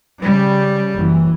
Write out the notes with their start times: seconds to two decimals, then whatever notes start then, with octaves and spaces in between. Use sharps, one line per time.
0.22 C#3 G3
0.95 F#1 F#2 E3